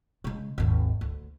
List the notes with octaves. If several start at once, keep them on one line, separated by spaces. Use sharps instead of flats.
C#3 G#3
G#1 D#2
D2